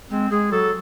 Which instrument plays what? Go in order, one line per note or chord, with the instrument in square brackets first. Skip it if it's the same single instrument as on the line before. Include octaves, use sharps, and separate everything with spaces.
[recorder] G#3 [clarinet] C4
[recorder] G#3 [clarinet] G#4
[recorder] F#3 [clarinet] A4